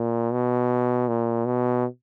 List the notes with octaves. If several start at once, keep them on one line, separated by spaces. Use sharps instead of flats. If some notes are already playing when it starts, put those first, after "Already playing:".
Already playing: A#2
B2
A#2
B2